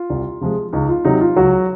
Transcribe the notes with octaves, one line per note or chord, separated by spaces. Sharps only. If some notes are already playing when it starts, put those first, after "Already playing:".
Already playing: F4
C2
C3 F3 G#3
C#2 D#4
F4
C3 F#3 D#4
F4
C#2 F#3 F#4